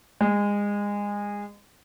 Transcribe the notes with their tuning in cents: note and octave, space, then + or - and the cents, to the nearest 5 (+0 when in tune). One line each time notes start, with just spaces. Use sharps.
G#3 -25